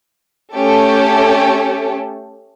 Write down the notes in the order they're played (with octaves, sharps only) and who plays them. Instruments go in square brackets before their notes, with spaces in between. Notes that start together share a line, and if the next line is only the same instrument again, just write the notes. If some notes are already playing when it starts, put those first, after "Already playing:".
[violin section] A3 C#4 G4 A4